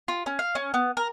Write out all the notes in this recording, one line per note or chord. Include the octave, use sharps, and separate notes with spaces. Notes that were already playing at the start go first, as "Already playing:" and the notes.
F4
C#4
F5
C#4
B3
A#4